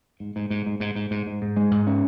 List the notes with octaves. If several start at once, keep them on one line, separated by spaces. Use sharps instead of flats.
G#2
G#2
G#2
G#2
G#2
G#2
G#2
G#2
G#2
G#3
G#2
C#4